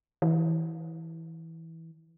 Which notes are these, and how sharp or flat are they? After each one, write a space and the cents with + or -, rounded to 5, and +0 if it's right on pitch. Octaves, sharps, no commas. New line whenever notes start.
E3 -15